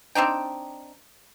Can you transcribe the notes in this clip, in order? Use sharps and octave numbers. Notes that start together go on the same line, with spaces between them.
C4 D4 D#4 G5